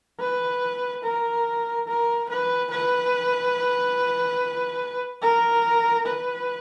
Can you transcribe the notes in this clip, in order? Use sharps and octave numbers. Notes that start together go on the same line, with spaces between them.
B4
A#4
A#4
B4
B4
A#4
B4